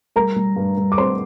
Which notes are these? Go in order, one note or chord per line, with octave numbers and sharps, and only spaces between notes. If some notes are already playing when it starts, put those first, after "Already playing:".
G3 A#4 A#5
G3
G2
G2
D6
C4 C5 C6